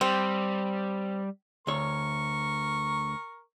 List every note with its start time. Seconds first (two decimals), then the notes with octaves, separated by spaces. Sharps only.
0.01 G3 C4
1.67 D2 A#4 C#5 C#6